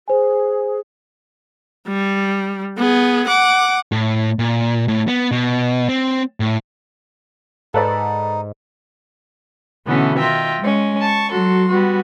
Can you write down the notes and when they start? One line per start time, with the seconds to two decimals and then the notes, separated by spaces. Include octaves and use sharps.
0.08 G#4 C5 G#5
1.87 G3
2.77 B3 G#4
3.27 F#5 D6
3.92 A2
4.39 A#2
4.88 A2
5.08 B3
5.32 B2
5.89 C4
6.40 A2
7.74 G#2 D#4 A4 B4 D5
9.87 B2 D3 E3 A3 B3 C#4
10.19 D#3 F4 E5 G5 A#6
10.60 G#3 C#4
11.00 A5 C#6
11.30 F#3 F#4 A4 C6
11.69 G3 B3 F#4